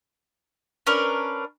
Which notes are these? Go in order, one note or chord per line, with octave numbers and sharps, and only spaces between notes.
C#4 D4 A#4 B4